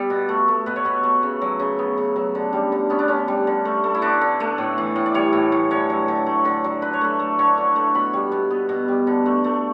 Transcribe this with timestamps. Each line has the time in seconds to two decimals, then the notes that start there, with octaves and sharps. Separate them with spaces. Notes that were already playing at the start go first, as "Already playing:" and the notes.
Already playing: G3 B3 D5 E5
0.10 B2
0.29 A3
0.48 A3
0.66 B2 B4
0.76 C#5
0.85 B2 B4
1.04 A3
1.23 C#3
1.41 F#3
1.60 C#3
1.79 B3
1.98 C#3
2.16 F#3
2.35 D3
2.53 G3
2.72 D3
2.90 B3 C#4
2.99 D4
3.08 D3 C#4
3.28 G3
3.47 D3
3.65 A3
3.84 A3
3.95 E4
4.02 D3 D4
4.21 D3
4.40 A3
4.58 A2
4.78 E3
4.96 A2
5.06 D5
5.15 G3 C#5
5.33 A2
5.52 E3
5.71 D3 C#5
5.90 F#3
6.08 D3
6.26 A3
6.45 D3
6.64 F#3
6.82 D3 B4
6.93 C#5
7.01 A3 B4
7.19 A3
7.39 D3 C#5
7.58 D3
7.76 A3
7.95 B2 B5
8.13 G3
8.32 B2
8.50 B3
8.69 B2
8.88 G3
9.07 D3
9.26 A3
9.44 A3